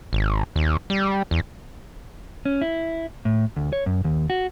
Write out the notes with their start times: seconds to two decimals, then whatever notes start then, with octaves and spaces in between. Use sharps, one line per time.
0.13 G#1
0.56 D#2
0.90 G3
1.31 E2
2.45 C#4
2.61 E4
3.25 A2
3.56 D2
3.73 C#5
3.86 F#2
4.04 D#2
4.30 F#4